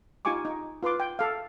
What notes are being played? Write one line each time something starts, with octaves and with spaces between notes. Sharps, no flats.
D#4 F4 G4 G#5 C#6 D6
D#4
F4 B4 C6 D6
G5
A4 F5